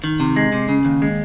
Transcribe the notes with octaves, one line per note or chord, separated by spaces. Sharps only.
D#3
C3
G#3
C3
C#3
D#2
G#3